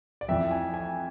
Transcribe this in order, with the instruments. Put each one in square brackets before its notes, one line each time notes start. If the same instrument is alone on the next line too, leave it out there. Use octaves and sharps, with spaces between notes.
[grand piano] D5
F2 E3 E5
G#5
G#5